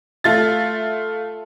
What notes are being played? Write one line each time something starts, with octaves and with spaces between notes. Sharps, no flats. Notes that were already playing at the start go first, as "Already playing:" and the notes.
A3 F4 A6